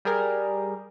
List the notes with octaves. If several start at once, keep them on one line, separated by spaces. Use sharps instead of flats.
G3 G#4 A#4